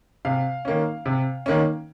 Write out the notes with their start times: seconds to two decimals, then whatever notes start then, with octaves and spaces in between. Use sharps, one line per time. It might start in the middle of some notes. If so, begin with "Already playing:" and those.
0.25 C3 F5
0.65 D#3 A#3 C#4
1.06 C3
1.46 D#3 A#3 C#4